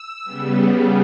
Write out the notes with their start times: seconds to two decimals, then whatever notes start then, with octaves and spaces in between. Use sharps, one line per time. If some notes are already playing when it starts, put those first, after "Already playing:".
Already playing: E6
0.24 C#3 G3 B3